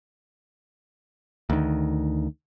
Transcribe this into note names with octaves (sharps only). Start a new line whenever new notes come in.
D2 D#3